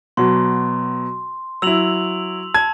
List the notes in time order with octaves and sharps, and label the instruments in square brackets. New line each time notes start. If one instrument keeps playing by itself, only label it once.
[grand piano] B2 F#3 [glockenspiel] C6
[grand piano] F#3 E4 [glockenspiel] E6 F7 F#7
[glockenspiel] A5 [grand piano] G#6